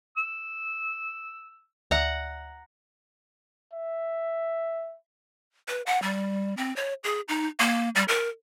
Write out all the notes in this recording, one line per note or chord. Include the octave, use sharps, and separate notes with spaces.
E6
D2 D5 E5 F#5 A#5
E5
B4
F#5
G3
C4
C#5
G#4
D#4
A#3
G3
A#4